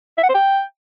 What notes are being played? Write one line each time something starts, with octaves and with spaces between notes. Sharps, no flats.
E5
F#5
C5
G5